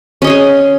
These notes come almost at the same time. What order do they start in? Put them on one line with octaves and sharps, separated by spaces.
C#4 D#5 C#5 G#4